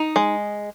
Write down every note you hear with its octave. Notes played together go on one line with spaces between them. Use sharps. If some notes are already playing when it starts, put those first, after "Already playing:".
Already playing: D#4
G#3